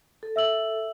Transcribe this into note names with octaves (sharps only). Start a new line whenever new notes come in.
A4
E5 E6 F#7